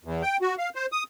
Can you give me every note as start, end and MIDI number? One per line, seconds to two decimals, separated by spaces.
0.04 0.23 40
0.23 0.37 79
0.42 0.55 66
0.58 0.69 77
0.75 0.86 72
0.92 1.03 87